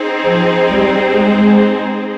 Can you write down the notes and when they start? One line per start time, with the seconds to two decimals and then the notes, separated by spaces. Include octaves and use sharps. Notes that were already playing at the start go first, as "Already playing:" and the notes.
Already playing: C4 D#4 G#4 C5
0.25 F3
0.70 G3
1.16 G#3